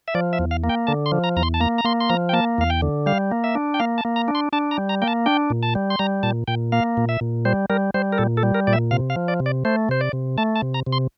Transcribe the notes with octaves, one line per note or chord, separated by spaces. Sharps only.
E5
F3 D5
E5
E2
F5
A#3
G5
D3 A5
C6
F3
A#5
E2 A#5
C6
A5
A#3 A#5
A#5
A#3 C6
C6
F3 A#5
G5
A#3 A5
E2 F5
G5
D3
G3 F5
A#3
E5
D4
G5
A#3 F5
A5
A#3
A#5
D4
C6
D4 A5
A#5
G3
A#5
A#3 G5
A5
D4 G5
A#2
A5
G3
C6
G3 A#5
A#2 A5
A#2 G5
A#3 F5
A#2
E5
A#2
G3 C5
G3 A#4
G3 C5
A#4
A#2 A4
A4
G3
A#4
A#2 D5
E5
C3 F5
F5
F3
D5
C3
D5
A3 C5
C3 C5
D5
C3
A3 A5
A5
C3
A#5
C3
C6